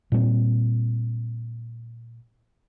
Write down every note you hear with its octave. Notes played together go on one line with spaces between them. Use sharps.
A#2 G3 G#3 C4